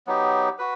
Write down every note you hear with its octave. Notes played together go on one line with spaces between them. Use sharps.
F#3 B3 D#4 G4
F#4 B4